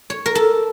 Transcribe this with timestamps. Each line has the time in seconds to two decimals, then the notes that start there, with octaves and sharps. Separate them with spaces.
0.10 C#5
0.26 A#4
0.35 A4